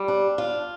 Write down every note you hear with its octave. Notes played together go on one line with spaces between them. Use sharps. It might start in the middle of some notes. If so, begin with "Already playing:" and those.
Already playing: G3
D4
F4